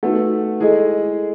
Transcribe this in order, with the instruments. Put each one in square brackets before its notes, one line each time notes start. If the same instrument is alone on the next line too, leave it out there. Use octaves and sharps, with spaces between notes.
[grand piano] A3 A4 [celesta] D#4 F#4 B4 F#5
[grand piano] G#3 G#4 [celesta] E4 A4 D#5